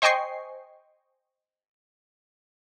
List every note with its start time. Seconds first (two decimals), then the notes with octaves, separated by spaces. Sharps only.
0.02 C5 D#5 G5 G#5 C#6 C7